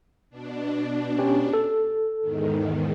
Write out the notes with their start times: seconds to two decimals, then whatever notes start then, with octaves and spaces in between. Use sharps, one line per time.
0.30 B2 D4
1.18 C#4 G4 C#5
1.53 A4
2.21 E2 G#2 D#3